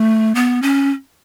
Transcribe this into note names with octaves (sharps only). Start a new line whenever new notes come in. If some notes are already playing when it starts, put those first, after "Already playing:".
Already playing: A3
B3
C#4